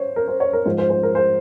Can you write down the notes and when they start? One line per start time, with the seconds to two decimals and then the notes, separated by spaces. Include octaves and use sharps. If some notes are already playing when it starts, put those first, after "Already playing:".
Already playing: C5 C#5
0.16 A#4
0.28 C5
0.40 C#5
0.53 A#4
0.65 G#2 F3 C5
0.78 C5
0.90 C5
1.03 A#4
1.15 C5